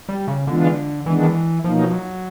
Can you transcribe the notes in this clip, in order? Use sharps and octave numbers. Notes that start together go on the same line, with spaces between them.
G3
C#3
D3 E3 G#3 B3 D4 F4
D#3 E3 G#3 B3 D4
B2 F3 F#3 A#3 D#4
F#3